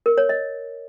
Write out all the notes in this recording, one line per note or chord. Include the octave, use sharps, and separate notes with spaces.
A#4
C#5
D#5